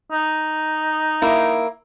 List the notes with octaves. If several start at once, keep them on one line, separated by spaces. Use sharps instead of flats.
D#4
A#3 E4